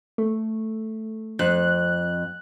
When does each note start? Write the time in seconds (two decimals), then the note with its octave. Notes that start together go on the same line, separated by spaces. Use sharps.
0.18 A3
1.39 F2 F#6